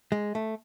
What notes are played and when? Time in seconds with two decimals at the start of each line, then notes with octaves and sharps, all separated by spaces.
0.12 G#3
0.35 A3